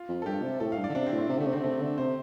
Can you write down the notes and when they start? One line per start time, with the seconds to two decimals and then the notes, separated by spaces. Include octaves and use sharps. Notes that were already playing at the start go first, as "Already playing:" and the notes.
Already playing: F4
0.09 F2
0.22 A4
0.26 G2 G4
0.43 C3
0.60 A2 A4
0.72 F5
0.78 G2
0.84 D5
0.89 D3
0.95 C3 D4
1.06 C4
1.12 A2
1.18 C4
1.29 C3
1.38 D3 A3
1.46 C3
1.53 D3 C4
1.64 C3 A3
1.82 D3
1.98 C3 C5